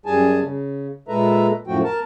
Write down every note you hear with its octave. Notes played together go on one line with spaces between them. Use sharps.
F#2 G3 G#4 G#5 A5
C#3
A#2 G#3 A4 B4 E5 A#5
F#2 A2 F3 A3 F#4 G5
A#4 A5